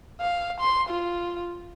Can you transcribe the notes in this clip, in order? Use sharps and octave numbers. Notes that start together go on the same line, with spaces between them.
F5
C6
F4